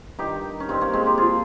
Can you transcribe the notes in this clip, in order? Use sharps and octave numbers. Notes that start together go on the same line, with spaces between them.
G2 D#3 D#4 G4
C#4
G2 D#3 C4 D#4
A#3 C#4
G#3 C4
D#4 G4
A#2 F3 F4 G#4